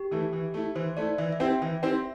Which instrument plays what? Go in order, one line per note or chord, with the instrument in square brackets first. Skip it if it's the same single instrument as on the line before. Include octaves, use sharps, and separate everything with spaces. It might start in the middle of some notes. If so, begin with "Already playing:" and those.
Already playing: [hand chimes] G4
[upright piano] E3 A3 E4
E3
A3 E4
[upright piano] E3 [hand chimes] C5
[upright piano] A3 E4 [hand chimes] D5
[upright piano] E3 [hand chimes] E5
[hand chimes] E5
[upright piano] C4 E4 G4 C5
[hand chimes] G5
[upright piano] E3 [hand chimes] E5
[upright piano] C4 E4 G4 C5 [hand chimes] E5